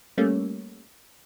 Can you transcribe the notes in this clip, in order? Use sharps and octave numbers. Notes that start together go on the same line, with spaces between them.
G3 A3 A#3 C#4